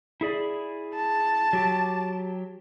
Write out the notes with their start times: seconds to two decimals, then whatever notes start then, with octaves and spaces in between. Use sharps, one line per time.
0.21 E4 G#4 D5
0.95 A5
1.53 F#3 G4